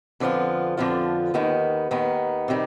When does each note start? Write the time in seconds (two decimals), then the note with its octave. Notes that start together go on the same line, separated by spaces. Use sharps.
0.20 F2 D3 F3 B3 F4
0.77 F2 D3 F3 B3 F4
1.34 D#2 D#3 B3
1.91 D#2 D#3 B3
2.48 C3 D#3 G3